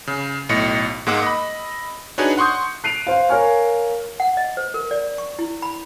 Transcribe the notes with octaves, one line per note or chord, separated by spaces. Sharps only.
C#3
B1 A2 D#5 C#7
G#2 G#3 A#3 F#5 D6 E6
D#5 B5
D4 D#4 F#4 G#4 B4 C#5
F#5 C6 C#6 D#6 G6
F#6 C7 D7 D#7 F7
C5 F5
A#4 C#5 F5 G#5 C#6 F6
F#5
D#5
C5
A#4
D5
C#6
E4
B5